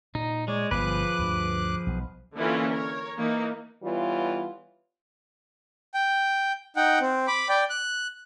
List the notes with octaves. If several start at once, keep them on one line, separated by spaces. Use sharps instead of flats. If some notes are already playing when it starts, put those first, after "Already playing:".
A#2 D#4
G#3 C#5 D5
G1 F3 B3 G#4 B4 D6 F#6
D2 G2
B1
D3 E3 A#3 C#4 E4 F4
A#4 C#5
E3 A#3 D#4
E3 G3 B3 F4 C#5
G5
D#4 F#5 G5
C4
B5 D6
D5 G5
F#6